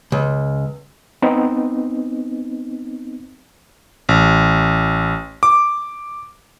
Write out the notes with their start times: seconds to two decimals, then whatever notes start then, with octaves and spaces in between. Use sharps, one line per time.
0.12 C#2
1.22 B3 C4 D#4
4.09 A1
5.43 D6